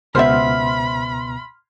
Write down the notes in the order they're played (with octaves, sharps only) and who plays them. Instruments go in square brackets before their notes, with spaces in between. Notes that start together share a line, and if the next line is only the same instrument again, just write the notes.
[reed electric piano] C#2 B2 B3 [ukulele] C5 E5 [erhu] B5 [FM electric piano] C6 F6